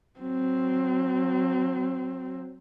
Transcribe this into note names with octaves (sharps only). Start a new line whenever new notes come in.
F#3 C4